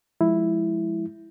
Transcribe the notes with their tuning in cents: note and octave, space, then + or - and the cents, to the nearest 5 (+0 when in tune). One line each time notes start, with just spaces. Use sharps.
F3 +0 G#3 +0 E4 +0